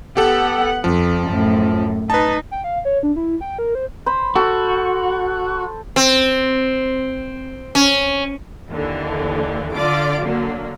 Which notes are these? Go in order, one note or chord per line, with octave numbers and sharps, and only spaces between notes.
B3 G4 A4 F#5
F2 F3
F#2 A2
D#4 B4 A5
G5
F5
C#5
D4
E4
G5
A#4
C5
C5 B5
F#4 A4
C4
C#4
D#2 D3 E3
D3 F4 D5 D6
D3 F#3 A#3